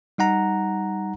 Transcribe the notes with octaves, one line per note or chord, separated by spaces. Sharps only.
G3 D#4 F#5 A#5